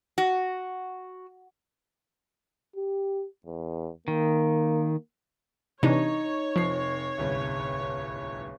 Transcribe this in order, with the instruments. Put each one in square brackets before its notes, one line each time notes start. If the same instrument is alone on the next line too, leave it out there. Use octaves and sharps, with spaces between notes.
[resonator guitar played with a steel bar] F#4
[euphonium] G4
E2
[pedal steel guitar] D#3 [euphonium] A#3
[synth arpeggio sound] C3 E3 D4 [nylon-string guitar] D#4 [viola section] C#5
[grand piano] F1 C7 [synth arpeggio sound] F3
[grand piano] D1 G1 C2